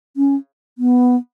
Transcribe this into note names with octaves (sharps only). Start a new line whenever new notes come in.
C#4
B3